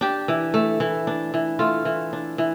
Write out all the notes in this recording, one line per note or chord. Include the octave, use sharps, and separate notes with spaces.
D4 G4
E3
A3
E3
D4
E3
A3 F4
E3
D4
E3